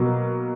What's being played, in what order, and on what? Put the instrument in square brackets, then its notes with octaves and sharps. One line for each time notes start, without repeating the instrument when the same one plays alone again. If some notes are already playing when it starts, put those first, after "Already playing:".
Already playing: [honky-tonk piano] B2 F#3 A#3